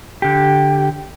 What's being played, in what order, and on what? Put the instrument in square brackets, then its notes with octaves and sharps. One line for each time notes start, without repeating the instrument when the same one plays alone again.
[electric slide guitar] D3 G4